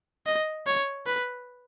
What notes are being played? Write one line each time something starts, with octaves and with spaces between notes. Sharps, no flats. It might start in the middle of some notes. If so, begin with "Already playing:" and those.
D#5
C#5
B4